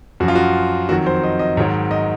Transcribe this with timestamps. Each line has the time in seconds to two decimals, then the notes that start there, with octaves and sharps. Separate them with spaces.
0.20 F#2 F3 F#4
0.28 F4
0.35 F#4
0.89 F2 D#3 F#3 F#4
1.06 C5
1.24 D#5
1.39 D#5
1.57 G#2 D#3 F#3 C#5
1.91 D#5